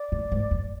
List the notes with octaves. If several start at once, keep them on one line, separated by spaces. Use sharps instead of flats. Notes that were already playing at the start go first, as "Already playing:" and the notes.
Already playing: D5
A2
G#2
F2